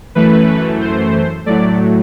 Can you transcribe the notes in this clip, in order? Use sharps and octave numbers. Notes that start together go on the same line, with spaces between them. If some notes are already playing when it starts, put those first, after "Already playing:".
F#2 E3 A3 B4
C5
A2 F#3 A3 D5